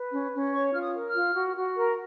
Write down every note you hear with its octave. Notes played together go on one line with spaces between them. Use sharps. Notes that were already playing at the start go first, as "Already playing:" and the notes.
Already playing: B4
C#4
C#4
C#5 C#6
F4 F6
D#6
A#4
F6
F4
F#4
F#4
A#4